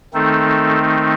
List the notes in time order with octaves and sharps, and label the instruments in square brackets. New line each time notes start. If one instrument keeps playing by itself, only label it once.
[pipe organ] D#3 A3 C4 D#4 A4